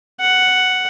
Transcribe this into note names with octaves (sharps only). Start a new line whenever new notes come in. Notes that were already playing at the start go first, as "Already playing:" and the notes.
F#5